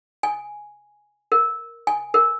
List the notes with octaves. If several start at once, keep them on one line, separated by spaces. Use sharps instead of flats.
G#5
A#4
G#5
A#4